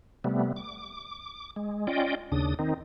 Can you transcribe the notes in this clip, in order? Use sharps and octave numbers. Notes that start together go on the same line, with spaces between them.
C3 G3 A3 B3
D6
G#3
C#4 F4 D5 D#5 G5
D#2 C#3 D4 D#6
D#3 C4 D#4